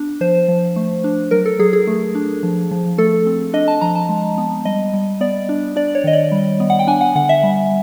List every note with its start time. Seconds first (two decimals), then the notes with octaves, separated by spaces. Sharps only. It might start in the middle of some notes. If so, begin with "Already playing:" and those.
Already playing: B3 D4
0.21 F3 C5
0.48 F3
0.76 A3
1.04 D4
1.31 F#3 A#4
1.46 A4
1.59 F#3 G#4
1.73 G#4
1.87 A3
2.15 D4
2.43 F3
2.71 F3
2.98 A3 A4
3.27 C4
3.53 D4 D#5
3.68 A5
3.81 F3 A#5
3.95 A5
4.09 G#3
4.38 B3
4.65 G3 D#5
4.94 G3
5.21 B3 D5
5.49 D4
5.76 D4 D5
5.95 C#5
6.04 D#3 D#5
6.13 D5
6.32 G3
6.60 B3
6.70 F#5
6.79 G5
6.87 D4 G#5
7.01 F#5
7.15 D3 F#5
7.29 E5
7.43 G3